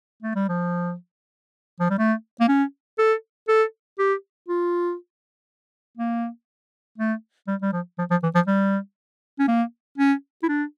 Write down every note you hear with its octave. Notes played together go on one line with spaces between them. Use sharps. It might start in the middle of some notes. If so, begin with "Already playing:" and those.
A3
G3
F3
F3
G3
A3
A#3
C#4
A4
A4
G4
F4
A#3
A3
G3
G3
F3
F3
F3
E3
F3
G3
C#4
A#3
C#4
E4
D4